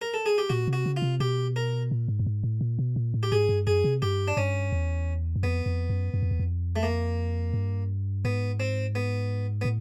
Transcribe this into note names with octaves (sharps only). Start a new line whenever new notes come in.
A#4
A4
G#4
G4
A#2 F#4
C3
F#4
C#3
F4
C3
B2 G4
A#4
A#2
G#2
G2
G#2
A2
A#2
B2
A#2
A2
G4
G#2 G#4
G2
F#2 G#4
C3
G2 G4
D4
G2 C#4
E2
F#2
F2 B3
F2
F#2
F#2
F2
E2
F2
A3
A#3
G2
G#2 B3
C4
B3
B3
A2